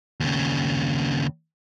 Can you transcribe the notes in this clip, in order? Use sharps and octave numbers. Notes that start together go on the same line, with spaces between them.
D#2 C#3